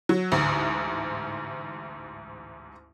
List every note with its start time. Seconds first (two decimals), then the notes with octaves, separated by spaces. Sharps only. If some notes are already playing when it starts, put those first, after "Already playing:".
0.09 F#3
0.32 A1 D2 G#2